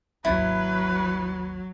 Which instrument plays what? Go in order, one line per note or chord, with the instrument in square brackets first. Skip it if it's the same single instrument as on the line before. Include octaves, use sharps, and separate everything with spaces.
[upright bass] G#1 D#2 [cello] F#3 [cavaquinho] E4 [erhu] B4